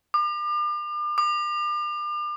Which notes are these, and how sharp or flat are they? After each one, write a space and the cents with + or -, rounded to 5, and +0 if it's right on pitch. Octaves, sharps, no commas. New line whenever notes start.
D6 +40
D6 +40